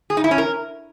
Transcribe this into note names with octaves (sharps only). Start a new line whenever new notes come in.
G#4
D#4
E4
C#4
A#4